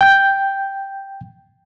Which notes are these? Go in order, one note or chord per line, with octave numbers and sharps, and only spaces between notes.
G5 G6